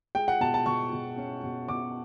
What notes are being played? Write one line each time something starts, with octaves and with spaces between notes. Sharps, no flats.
G#3 G5
F#5
B2 A5
A5
B2 C#6
B2
C#4
B2
B2 D6